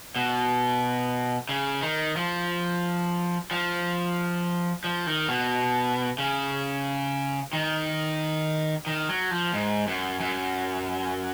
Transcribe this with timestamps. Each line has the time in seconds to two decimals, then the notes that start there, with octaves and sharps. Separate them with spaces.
0.16 B2
1.49 C#3
1.82 D#3
2.17 F3
3.51 F3
4.84 F3
5.07 D#3
5.28 B2
6.18 C#3
7.53 D#3
8.86 D#3
9.09 F#3
9.31 F3
9.54 G#2
9.87 F#2
10.20 F#2